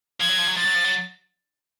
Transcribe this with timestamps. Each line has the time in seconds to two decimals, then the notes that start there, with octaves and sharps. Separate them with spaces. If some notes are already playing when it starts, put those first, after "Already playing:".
0.20 F3 G#6
0.29 F#3
0.39 F3
0.48 F#3
0.57 F3 A6
0.65 F#3
0.75 F3
0.84 F#3